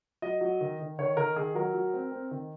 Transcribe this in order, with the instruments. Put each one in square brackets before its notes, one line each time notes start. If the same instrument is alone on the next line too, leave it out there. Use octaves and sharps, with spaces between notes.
[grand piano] F#3 D#5
F#3
D#3
D#3
D#3 C#5
D#3 A#4
D#3 G#4
F#3 A#4
F#3
C4
C4
D#3